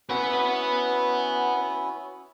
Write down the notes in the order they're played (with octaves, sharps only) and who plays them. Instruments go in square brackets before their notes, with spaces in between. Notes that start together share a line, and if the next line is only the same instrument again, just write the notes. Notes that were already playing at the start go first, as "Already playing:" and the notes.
[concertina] C#4 E4 F#4 [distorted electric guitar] B4 F#5